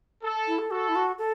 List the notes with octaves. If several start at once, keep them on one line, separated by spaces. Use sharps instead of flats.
A4
E4
A4
F#4 A4
E4
F#4
A4